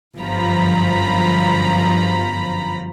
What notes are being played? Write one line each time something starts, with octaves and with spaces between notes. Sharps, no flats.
G1 F#2 F3 A#5 B5